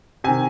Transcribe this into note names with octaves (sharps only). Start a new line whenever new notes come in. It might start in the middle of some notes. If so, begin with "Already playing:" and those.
C3 D#3 G#5